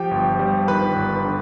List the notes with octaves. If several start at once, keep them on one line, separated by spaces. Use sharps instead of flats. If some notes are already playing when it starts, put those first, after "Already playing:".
Already playing: F3 G4 G5
G1
G3
D#3 B4 B5
G1
D3